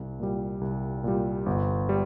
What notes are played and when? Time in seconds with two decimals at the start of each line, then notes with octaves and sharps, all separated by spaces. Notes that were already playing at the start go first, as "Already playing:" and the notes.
Already playing: C2
0.20 A#2 G3
0.61 C2
1.04 A#2 G3
1.46 G1
1.89 G3